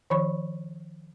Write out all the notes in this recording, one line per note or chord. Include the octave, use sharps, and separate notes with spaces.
D#3 F3 C#5 B5 C#6